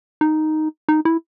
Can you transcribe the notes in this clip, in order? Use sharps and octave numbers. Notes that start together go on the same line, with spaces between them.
D#4
D#4
E4